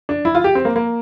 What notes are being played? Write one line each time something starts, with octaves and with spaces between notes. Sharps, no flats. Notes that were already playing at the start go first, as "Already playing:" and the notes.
D4
E4
F4
G4
C4
A#3
A#3